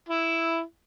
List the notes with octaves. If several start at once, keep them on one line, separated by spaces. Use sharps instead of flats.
E4